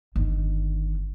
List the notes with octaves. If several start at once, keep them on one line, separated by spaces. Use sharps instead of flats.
G1 D#3